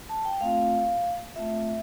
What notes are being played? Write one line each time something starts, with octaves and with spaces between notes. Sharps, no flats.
A5
G5
A3 C4 F4 F5
A3 C4 F4 E5